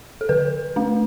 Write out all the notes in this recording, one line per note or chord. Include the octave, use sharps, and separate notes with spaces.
A4
D3 B4
A3 D4